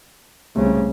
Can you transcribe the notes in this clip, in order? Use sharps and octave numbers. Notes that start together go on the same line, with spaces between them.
C2 C#3 A3